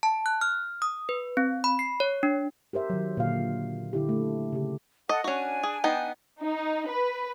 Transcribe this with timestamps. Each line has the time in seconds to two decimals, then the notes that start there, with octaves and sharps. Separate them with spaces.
0.03 A5
0.26 F#6
0.41 F6
0.82 D#6
1.09 B4
1.37 C4
1.64 B5
1.79 C7
2.00 C#5
2.23 D4
2.73 G4 A#4 C5 E5
2.90 D#3 F#3
3.17 A#2 D3 F5
3.93 D3 E4 G4
4.09 A3
4.53 C#3 G4
5.09 A4 D#5 F#5
5.24 C#4 D4 F#4 G#5
5.63 G#4
5.84 B3 D#4 G5
6.43 D#4
6.90 B4